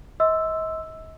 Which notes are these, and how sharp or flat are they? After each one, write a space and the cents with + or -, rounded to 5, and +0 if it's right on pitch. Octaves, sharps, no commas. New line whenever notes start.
D#5 +45 C6 +0 E6 +0